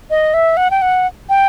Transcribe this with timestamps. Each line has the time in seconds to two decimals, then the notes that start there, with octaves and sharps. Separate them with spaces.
0.10 D#5
0.34 E5
0.57 F#5
0.71 G5
0.82 F#5
1.29 G5